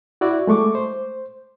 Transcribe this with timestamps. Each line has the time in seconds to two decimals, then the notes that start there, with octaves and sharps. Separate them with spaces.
0.21 E4 F#4 D5
0.47 G#3 A3 C#6 D6
0.75 C5